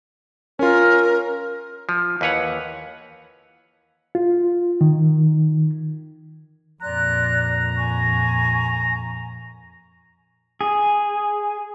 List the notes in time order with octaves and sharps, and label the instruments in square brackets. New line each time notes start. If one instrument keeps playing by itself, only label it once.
[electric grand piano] C#4 F4 [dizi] A#4
[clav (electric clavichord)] F3
D#2 E3 B4 C#5 F#5
[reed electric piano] F4
D#3
[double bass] F2 A#2 [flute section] D5 C6 F#6 [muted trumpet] A#5
[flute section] G#5 C#6
[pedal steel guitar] G#4